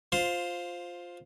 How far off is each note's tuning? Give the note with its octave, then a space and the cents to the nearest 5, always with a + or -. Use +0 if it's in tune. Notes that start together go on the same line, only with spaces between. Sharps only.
F4 +10 C5 +0